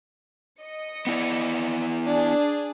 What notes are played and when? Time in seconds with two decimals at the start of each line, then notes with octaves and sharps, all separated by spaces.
0.60 D#5 C#7
1.07 B3 E4 D5
2.05 D4 G#4